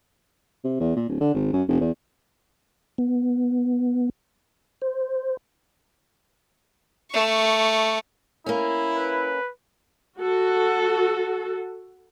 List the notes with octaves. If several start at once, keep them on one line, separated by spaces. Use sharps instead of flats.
C3
E2
A#2
D1
D3
G#1
F#2
F1
E2
B3
C5
A3 C#6
A#3 C#4 E4
B4
F#4 A4